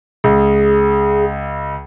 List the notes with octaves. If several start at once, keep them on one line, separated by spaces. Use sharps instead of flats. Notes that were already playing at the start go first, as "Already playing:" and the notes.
C#2 G#4